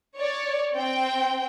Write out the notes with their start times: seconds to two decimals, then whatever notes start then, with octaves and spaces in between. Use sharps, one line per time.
0.17 C#5 D5
0.75 C4 G5